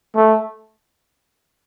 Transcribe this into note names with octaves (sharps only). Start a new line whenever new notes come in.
A3